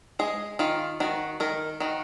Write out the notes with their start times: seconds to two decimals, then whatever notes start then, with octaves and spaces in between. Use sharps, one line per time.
0.19 G#3 G#4
0.59 D#3 F4
1.00 D#3 F#4
1.40 D#3 A#4
1.80 D#3 F#4